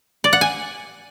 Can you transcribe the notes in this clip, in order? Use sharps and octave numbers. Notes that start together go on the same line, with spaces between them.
D5
F#5
G#5